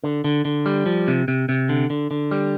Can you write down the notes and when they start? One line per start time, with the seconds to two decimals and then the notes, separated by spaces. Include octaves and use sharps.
0.04 D3
0.24 D3
0.45 D3
0.66 G3
0.86 F3
1.08 C3
1.28 C3
1.49 C3
1.69 D3
1.90 D3
2.11 D3
2.31 G3